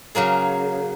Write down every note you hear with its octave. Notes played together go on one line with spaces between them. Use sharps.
C#3 F#3 A#3 G#4